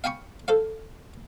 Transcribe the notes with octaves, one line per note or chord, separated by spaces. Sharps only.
F5 G5 G#5 B5 C#6
A4 C5 F5